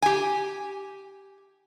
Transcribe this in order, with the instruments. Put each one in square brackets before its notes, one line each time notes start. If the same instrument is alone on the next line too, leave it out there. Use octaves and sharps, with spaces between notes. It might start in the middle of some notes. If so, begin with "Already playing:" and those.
[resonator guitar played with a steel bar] G4 G#5